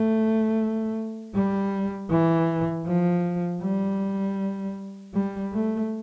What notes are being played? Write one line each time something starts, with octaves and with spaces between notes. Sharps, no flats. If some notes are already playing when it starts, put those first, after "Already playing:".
Already playing: A3
G3
E3
F3
G3
G3
A3